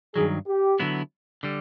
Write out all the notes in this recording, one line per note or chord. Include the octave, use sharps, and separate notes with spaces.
G2 D#3 F#3 G#4
G4
D3 F#3 B3 E4
D3 G3